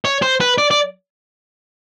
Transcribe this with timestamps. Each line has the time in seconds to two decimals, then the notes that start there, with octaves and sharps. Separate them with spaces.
0.05 C#5
0.22 C5
0.41 B4
0.58 D5
0.71 D5